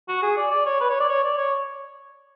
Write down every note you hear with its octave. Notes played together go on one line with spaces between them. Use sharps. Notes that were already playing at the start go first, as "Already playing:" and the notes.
F#4
G#4
D5
D5
C#5
B4
C#5
D5
C#5
D5
C#5